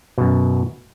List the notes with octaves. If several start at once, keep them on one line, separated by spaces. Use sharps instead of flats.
F#2 B2